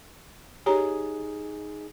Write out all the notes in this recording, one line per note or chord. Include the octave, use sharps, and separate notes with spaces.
D#4 G4 G#4 C#5 A#5